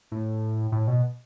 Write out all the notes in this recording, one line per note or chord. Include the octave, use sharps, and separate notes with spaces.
A2
A2
B2